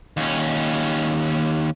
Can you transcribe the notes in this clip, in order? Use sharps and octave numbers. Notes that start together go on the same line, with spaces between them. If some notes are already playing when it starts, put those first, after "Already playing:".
D#2 C#4